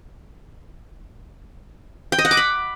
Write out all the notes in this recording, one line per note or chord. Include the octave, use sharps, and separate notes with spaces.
G5
D#5
F#5
D6
B5